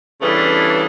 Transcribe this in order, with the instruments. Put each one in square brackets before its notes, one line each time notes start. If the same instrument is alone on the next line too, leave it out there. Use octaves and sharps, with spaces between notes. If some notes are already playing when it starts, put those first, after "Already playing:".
[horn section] C#3 E3 G3 A3 B3 D4